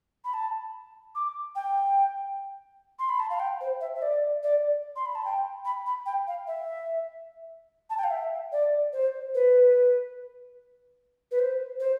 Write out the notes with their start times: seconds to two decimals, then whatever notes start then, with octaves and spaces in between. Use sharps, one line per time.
0.24 B5
0.33 A5
1.15 D6
1.55 G5
2.99 C6
3.09 B5
3.20 A5
3.30 F5
3.40 G5
3.61 C5
3.81 E5
3.95 E5
4.02 D5
4.43 D5
4.96 C6
5.06 B5
5.15 A5
5.25 G5
5.65 B5
5.86 B5
6.06 G5
6.27 F5
6.47 E5
7.90 A5
7.98 G5
8.04 F5
8.10 E5
8.52 D5
8.93 C5
9.34 B4
11.31 B4
11.39 C5
11.80 C5